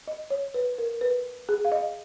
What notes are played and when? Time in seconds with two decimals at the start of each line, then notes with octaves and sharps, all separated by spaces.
0.08 D#5
0.30 C#5
0.54 B4
0.78 A#4
1.01 B4
1.49 G#4
1.65 F5
1.72 D#5